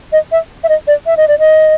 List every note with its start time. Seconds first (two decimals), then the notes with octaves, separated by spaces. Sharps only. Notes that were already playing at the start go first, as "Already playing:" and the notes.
0.12 D#5
0.32 E5
0.64 E5
0.69 D#5
0.87 D5
1.06 E5
1.17 D#5
1.28 D5
1.39 D#5